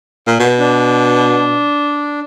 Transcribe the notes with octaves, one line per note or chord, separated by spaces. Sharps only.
A#2
B2
D4